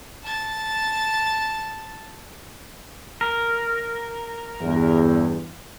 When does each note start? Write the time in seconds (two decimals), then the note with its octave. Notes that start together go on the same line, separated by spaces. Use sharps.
0.23 A5 A6
3.21 A#4
4.61 E2 G2